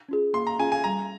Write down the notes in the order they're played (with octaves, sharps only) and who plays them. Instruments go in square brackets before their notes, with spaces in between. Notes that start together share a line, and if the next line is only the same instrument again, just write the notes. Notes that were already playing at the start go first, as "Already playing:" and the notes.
[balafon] C#4 F4 G#4
[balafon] A#3 [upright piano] C6
[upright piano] A#5
[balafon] C#4 F4 G#4 [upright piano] G#5
[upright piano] G#5
[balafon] G3 [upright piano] A#5